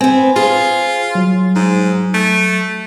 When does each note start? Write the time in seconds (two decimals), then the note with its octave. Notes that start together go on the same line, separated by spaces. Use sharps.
0.01 B3 C4 C5 G#5
0.36 F4 G#4
1.15 F#3
1.56 G#2
2.14 A3